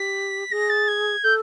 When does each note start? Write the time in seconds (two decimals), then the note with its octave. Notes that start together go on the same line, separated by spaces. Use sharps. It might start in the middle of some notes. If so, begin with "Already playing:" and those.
Already playing: G4 B6
0.51 G#4 A#6
0.69 A6
0.88 G#6
1.24 A4 G6